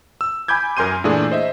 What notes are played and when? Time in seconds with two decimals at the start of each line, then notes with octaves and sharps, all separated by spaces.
0.21 E6
0.48 G#5 B5 D6 G6 G#6
0.77 F#2 A#4 G#5 C6 G6 D#7
1.04 A#2 E3 A3 D4 G#4
1.32 C5 D#5 E5